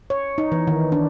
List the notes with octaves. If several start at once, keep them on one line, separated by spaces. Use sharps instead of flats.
C#5
D#4
E3
D#3
D4